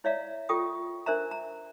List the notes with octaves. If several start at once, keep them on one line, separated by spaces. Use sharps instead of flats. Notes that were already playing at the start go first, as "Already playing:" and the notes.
E4 C#5 D5 E5 F5 A#5
F4 A4 G5 C#6 D#6
D4 A#4 C5 E5 A#5
A#5